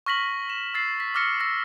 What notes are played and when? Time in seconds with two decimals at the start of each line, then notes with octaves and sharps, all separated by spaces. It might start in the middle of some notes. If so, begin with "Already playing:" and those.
0.06 C#6 F6 A#6 B6 F#7
0.50 E7
0.74 E6 A6 C7
1.00 B6
1.15 D6 E6 F6 A#6 C#7
1.40 E6 A#6